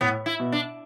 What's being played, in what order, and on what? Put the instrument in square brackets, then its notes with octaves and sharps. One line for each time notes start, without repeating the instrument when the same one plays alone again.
[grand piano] A2 [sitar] B3
[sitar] E4
[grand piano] B2
[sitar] D4